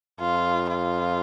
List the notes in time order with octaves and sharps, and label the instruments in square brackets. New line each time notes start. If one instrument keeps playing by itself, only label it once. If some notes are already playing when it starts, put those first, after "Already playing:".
[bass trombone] F2 [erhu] F4
[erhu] F4